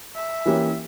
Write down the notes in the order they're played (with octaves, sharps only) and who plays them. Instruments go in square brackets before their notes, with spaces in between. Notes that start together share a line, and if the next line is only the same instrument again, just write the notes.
[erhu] E5
[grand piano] E3 A#3 C#4 G4